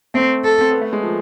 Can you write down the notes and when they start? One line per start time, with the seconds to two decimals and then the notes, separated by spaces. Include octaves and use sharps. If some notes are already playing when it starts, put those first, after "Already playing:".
0.14 A3 C4
0.44 A4
0.61 C4
0.71 B3
0.81 A3
0.93 G#3
1.03 F3